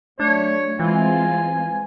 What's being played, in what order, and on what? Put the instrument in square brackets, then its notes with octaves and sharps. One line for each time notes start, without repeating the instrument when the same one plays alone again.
[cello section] F#3 A3 [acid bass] D4 [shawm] C#5
[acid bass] E3 [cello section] G#3 C4 F4 [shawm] G#5